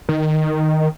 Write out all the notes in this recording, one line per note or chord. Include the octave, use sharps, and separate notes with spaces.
D#3